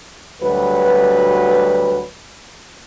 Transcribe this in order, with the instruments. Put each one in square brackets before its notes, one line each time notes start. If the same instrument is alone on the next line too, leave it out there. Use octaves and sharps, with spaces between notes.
[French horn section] D2 F#3 G3 B4